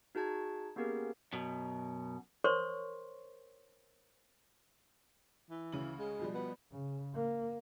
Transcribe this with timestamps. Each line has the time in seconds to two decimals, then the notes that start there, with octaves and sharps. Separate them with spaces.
0.15 D#4 F#4 G#4 A5 G#6
0.76 A#3 B3 C#4 G4 G#4 A#4
1.33 F#2 B2
2.44 A#4 C5 C#5 C6 C#6
5.50 E3
5.72 D2 C#3 F#7
5.99 G#3
6.19 B2 F3 G3
6.35 B3
6.72 C#3
7.15 A#3